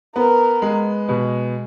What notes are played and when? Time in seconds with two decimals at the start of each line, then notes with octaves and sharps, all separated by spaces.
0.16 B3 A#4
0.62 G#3
1.08 B2